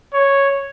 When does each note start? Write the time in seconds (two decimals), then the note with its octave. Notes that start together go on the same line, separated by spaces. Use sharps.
0.14 C#5